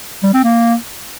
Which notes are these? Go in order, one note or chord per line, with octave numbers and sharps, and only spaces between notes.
G3
C4
A#3